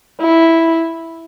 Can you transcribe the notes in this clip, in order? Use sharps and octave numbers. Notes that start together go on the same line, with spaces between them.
E4